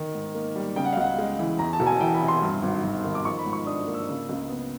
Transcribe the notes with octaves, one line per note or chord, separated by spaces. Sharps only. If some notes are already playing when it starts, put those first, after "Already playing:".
Already playing: D#3
G#2
A#3
G3
C#3 G5
F#5
F5
C#2 F#5
G#3
E3
E2 A#5
A5
E1
G#5
E3 G5
B5
C3
C6
G2
G#1
G#1
D#3
D6
F3 C#6
B5
G#2
C#6
D4 D#6
A#3
E6
C#3
C#2
B3